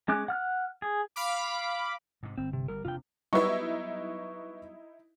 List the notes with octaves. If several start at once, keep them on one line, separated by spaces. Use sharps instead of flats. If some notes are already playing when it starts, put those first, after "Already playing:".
G#3 C#4 D6 F#6
F#5 F6 F#6
G#4
F5 B5 D6
G#2 C3
G1 C4
C3
G1 G3 A#4
E1 C3 D4 F4 G5
F#3 G3 B3 D#4 E4 B4 C#6